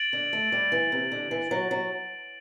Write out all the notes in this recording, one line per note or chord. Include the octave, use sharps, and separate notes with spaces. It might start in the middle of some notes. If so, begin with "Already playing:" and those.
Already playing: A6 D7 F#7
D3
A3
G3
E3
C3
D3
E3
F#3
F#3